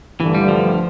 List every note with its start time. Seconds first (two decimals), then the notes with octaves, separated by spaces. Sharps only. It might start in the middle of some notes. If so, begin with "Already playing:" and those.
0.19 G2 D3 E3 A3
0.35 G3
0.48 F3